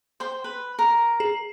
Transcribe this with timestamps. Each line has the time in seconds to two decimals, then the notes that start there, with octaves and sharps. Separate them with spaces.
0.20 C5 G5
0.44 B4
0.79 A#4
1.20 G#4